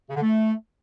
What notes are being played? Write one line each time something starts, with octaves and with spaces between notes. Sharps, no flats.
C#3
D3
A3